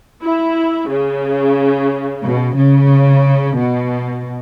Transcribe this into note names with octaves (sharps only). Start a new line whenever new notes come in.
E4
C#3
B2
C#3
B2